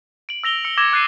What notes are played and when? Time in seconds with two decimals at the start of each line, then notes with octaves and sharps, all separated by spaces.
0.29 D7 F#7
0.44 E6 A#6 F7 G7
0.65 E6 C#7
0.77 D6 E6 G#6 A#6 E7
0.92 D6 F#6 A6 C7 D#7